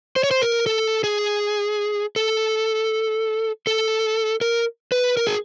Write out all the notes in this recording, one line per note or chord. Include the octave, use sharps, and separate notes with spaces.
C5
C#5
C5
A#4
A4
G#4
A4
A4
A#4
B4
A#4
G#4